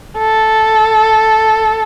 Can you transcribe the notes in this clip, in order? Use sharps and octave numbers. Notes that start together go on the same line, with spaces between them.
A4